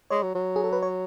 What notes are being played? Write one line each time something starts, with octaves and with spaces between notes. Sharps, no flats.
G#3 C#5
F#3
F#3
G#4
A4
B4
C#5